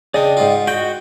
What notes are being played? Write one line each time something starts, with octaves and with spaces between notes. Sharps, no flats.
C#3 D4 D5 D#5 G5
G#2 F4
F#4 D#5 G5 G6